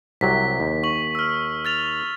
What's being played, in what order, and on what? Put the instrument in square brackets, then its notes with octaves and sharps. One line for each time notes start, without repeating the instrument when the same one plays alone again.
[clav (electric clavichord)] C2 C3 F#3 [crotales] B6
[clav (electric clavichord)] D#2
[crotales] C#6 F#7
E6 F6
F6 A6 F7